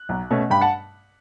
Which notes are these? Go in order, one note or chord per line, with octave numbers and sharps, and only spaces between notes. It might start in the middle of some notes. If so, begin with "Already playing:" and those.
Already playing: F#6
B1
B2 A3 C#4
G2 G5 B5
F#5 A5